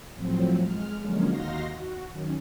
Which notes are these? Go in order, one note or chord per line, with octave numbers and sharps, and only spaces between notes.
A2 F3 F#3 C4
G#3 F6
D3 F3 F#3 G#3 A#3 C#4
D#2 D#4 F#4 F5 C6 A#6
F#4
F#2 D#3 C#4